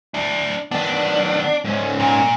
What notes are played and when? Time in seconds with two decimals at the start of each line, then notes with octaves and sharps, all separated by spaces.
0.14 D4 E4
0.71 D#3 B3 D4
1.65 G#2 C#4
2.00 A#2